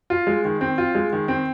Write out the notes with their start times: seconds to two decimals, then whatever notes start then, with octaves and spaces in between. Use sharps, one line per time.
0.10 F4
0.27 G#3
0.45 D#3
0.61 C4
0.78 F4
0.95 G#3
1.13 D#3
1.28 C4